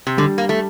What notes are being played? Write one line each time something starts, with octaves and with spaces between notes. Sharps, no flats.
C3
D3 G3
A#3
A3